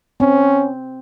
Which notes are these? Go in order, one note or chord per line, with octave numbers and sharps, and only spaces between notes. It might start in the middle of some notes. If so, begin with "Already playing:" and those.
C4 C#4